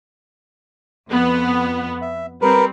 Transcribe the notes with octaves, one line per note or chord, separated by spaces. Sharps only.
F2 B3
E5
G3 C4 A#4 B4